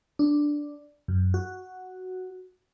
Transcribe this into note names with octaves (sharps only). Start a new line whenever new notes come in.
D4
F#2
F#4